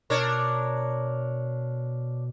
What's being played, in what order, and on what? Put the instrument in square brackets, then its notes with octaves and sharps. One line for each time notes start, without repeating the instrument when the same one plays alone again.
[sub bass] B2 [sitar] D4 A#4 C#5